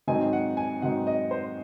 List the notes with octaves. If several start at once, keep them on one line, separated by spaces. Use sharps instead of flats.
G#2 D#3 F#3 C4 D#4 G#5
F#5
G#5
G#2 D#3 F#3 C4 D#4 F#5
D#5
C5